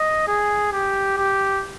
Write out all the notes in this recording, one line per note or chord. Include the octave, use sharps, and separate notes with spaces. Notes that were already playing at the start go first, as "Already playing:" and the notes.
Already playing: D#5
G#4
G4
G4